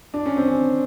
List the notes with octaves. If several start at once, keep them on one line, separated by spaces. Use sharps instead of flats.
D4
C#4
C4
C#4